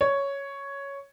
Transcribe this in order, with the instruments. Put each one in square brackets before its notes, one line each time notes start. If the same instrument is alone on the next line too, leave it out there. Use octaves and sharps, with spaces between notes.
[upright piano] C#5